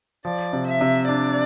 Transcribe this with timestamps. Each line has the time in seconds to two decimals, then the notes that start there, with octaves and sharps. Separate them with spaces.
0.25 F3 D5
0.53 C3
0.67 E5
0.81 C3
1.09 D4 D5